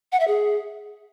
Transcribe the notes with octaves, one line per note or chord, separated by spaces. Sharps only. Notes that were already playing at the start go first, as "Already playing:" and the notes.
F#5
E5
G#4